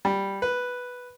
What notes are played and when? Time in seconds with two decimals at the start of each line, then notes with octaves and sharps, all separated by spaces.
0.05 G3
0.42 B4